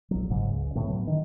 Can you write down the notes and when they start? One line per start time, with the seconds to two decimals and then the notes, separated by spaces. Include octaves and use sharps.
0.11 A#1 F#3
0.30 G1 G#2 C#3 F#3
0.51 C#2 C#3
0.75 A2 D3 B3
0.89 F#3 B3
1.07 D3 D#3